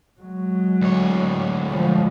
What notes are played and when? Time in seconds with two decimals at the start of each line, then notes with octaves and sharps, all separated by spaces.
0.21 F#3 G#3
0.81 D2 C#5
1.67 F3 G#3